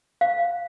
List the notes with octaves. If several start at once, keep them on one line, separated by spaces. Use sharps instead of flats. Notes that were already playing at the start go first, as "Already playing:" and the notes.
F5